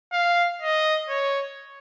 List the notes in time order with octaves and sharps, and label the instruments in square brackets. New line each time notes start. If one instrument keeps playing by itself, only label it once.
[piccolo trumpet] F5
D#5
C#5